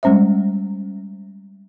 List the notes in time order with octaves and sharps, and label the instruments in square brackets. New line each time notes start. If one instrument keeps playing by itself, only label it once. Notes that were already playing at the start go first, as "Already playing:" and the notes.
[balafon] G3 G#3 C#4 C5 E5